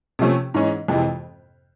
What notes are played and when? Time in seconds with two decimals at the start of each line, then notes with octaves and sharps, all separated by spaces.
0.19 C3 F3 A3 C#4
0.54 G#2 E3 G#3 C#4
0.88 F2 C3 E3 G#3